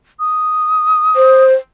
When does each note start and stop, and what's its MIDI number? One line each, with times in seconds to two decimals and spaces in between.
0.20 1.44 87
1.16 1.54 72